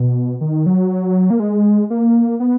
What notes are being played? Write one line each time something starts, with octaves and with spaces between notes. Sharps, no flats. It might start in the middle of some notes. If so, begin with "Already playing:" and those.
Already playing: B2
D#3
F#3
A#3
G#3
A#3
B3